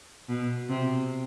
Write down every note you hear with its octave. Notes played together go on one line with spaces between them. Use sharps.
B2
C3